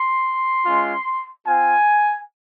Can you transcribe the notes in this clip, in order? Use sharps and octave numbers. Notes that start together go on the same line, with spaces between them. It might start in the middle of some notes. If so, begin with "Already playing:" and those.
Already playing: C6
G#3 C#4 F4
C4 F4 G#5